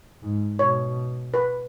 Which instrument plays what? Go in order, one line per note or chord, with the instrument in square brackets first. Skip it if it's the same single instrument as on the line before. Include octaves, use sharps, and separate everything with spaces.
[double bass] G#2
[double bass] B2 [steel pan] C#5
[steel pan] B4